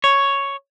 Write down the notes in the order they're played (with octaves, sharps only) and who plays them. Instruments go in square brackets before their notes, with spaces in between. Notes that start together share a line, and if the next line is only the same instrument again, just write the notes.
[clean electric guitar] C#5